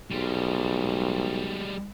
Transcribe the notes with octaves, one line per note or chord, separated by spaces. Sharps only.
B1 G3 G#3